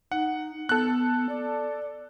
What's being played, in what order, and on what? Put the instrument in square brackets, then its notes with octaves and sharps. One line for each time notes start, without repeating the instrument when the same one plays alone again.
[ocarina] D#4 [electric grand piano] F#5
[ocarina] B3 [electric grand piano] A4 F#6
[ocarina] D5